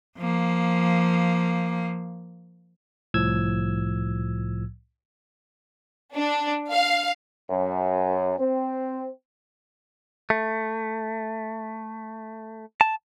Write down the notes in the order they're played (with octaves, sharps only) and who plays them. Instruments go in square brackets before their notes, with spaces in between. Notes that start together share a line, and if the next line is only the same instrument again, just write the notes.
[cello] F3 A#3
[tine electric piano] C2 A2 F3 E6 G#6
[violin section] D4
F5
[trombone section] F#2
C4
[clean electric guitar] A3
A5